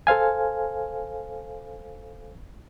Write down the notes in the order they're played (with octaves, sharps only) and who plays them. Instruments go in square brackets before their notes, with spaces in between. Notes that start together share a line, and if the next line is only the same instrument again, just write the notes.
[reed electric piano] A4 C5 F5 G#5